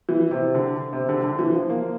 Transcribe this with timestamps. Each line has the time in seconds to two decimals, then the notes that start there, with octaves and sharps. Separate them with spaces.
0.09 E3
0.31 C3
0.55 D3
0.93 C3
1.09 D3
1.24 D3
1.39 E3
1.54 F3
1.70 A#3